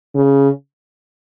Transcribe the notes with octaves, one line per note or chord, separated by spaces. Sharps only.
C#3